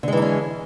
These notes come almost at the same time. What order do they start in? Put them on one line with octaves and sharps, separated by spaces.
D3 G#3 E3 D#4 C#4